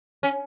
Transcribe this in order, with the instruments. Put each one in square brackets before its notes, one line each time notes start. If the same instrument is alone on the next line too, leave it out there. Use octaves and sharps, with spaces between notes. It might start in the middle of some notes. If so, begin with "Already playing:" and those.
[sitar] C#4